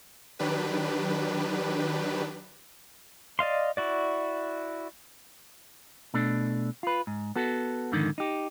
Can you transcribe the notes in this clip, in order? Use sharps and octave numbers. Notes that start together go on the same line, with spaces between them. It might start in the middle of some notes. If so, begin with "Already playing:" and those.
D#3 F#3 D4 G4 B4
D5 D#5 F5 C6
E4 F#4 D5
B2 A3 D4
F4 B4
G#2
B3 F#4 A4
F2 G#2 D3 D#3
D#4 G4